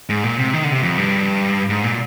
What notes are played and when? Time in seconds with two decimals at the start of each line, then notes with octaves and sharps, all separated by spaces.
0.09 G#2
0.24 A#2
0.38 C3
0.53 D#3
0.64 D3
0.72 C3
0.83 F2
0.98 G2
1.70 G#2
1.84 A#2